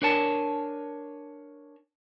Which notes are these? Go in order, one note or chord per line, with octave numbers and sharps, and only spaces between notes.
D4 A#4 C#5 G#5 A5